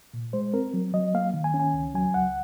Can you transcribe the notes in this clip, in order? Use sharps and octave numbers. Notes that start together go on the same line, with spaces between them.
A#2
G#3 C5
C4 A#4
F#3
F#3 D#5
A#3 F5
D#3
G#5
C#4
G#5
C#2
F#3 G#5
C#2 F#5